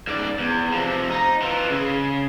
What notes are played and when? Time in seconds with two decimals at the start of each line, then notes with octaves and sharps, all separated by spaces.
0.07 G#2 D5
0.39 E2
0.73 C3 F3
1.10 D#4
1.42 E3 F4
1.70 C#3